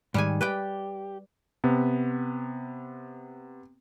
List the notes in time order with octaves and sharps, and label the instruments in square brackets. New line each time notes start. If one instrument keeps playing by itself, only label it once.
[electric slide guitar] G#2 D#3 [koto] G3 G#3 G#5
[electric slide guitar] G4 [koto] B4 D5 G5
[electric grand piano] C3 B3